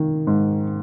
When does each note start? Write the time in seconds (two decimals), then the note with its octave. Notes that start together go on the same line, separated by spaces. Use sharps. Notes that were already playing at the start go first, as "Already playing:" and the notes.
Already playing: D#3
0.27 G#2